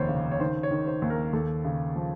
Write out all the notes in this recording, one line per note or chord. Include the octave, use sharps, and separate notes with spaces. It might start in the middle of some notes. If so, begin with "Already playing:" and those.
Already playing: F1 D#2 C5 C#5
C#3
C#5
D#3 C5
C#5
D#3
C5
D#2
A#4
D#2 A4
C#3
F3